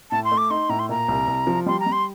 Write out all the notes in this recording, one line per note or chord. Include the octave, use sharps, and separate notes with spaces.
A2 A5
C6
A3
D6
D#4 C6
A2 A#5
C6
A#2 A#5
C2
C2
F3
G3 C6
A#5
G3
C6